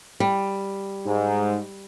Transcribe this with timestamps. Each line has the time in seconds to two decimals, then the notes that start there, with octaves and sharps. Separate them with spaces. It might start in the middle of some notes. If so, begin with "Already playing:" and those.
0.20 G3
1.06 G#2